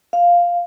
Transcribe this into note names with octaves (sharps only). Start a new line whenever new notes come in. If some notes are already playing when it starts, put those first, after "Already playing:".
F5